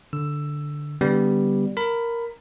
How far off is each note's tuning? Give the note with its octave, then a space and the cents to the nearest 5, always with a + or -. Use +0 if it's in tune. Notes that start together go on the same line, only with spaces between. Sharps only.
D3 +0 E6 +10
D3 -30 G3 +0 B3 +0
A#4 +0 B5 +15